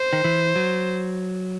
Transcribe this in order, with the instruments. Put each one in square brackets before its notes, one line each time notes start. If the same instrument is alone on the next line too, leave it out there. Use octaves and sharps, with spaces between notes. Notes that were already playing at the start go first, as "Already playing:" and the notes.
Already playing: [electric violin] C5
[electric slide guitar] D#3
E3
F#3